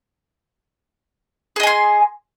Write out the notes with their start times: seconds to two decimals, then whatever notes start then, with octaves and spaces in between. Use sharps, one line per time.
1.56 G#4
1.60 D#5
1.63 G#5
1.67 C6